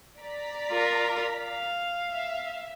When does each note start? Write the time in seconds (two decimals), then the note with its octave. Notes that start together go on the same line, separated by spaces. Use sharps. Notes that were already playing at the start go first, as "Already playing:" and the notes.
0.20 D5 A#5 B6
0.72 F4 A#4
1.37 F5
2.11 E5